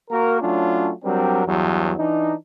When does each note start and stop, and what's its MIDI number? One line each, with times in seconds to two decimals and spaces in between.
0.11 0.41 58
0.11 0.41 66
0.11 0.41 70
0.42 0.92 54
0.42 0.92 57
0.42 0.92 61
0.42 0.92 62
0.42 0.92 65
1.04 1.43 54
1.04 1.43 55
1.04 1.43 60
1.04 1.43 62
1.04 1.43 70
1.46 1.93 40
1.46 1.93 43
1.46 1.93 54
1.98 2.34 52
1.98 2.34 62
1.98 2.34 63